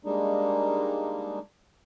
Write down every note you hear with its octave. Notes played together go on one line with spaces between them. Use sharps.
G3 G#3 A#3 D4 D#4